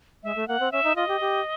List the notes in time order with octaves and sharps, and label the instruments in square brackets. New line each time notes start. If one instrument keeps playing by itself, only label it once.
[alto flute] G#3 [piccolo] E5
[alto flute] A3
[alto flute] A#3 [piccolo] F#5
[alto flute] C4
[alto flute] C#4 [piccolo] E5
[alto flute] D#4
[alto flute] F4 [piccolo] D#5
[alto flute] G4
G4